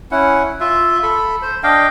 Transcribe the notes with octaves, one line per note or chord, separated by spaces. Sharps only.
C#4 E4 F#5
F4 E5
A4 B5
C5
D4 D#5 F5 G5